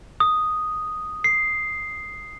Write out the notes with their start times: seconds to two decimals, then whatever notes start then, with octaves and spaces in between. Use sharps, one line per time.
0.20 D#6
1.24 C7